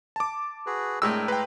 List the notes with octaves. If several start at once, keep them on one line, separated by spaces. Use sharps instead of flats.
A5 D6
F#4 G#4 B4
A2 G#3 D4 A#4 G5 E6
B4 G5 A#5 C6